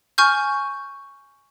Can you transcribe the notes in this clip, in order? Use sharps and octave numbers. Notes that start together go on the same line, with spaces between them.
G#5 C#6 F6 G6